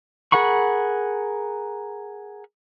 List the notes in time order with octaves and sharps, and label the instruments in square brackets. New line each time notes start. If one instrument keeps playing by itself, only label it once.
[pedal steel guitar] G#4 A#4 F#5 B5 C#6